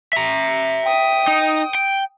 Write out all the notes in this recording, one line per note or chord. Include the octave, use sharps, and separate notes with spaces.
E5 A#5
G5 D#6
D#4
G5